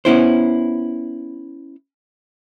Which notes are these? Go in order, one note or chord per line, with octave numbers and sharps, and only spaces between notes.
B3 C#4 E4 C5